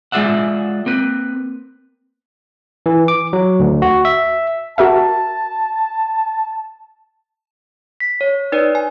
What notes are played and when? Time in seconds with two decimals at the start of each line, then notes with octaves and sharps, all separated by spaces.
0.12 G#3 F4 G#4 D5 E5 F#5
0.86 A#3 C4 B4
2.86 E3
3.08 D6
3.33 F#3
3.60 D2
3.82 F#4
4.05 E5
4.78 F#4 A#4 E5 A5
8.00 B6
8.21 C#5
8.52 D#4 B4 C#5 D5
8.75 G#5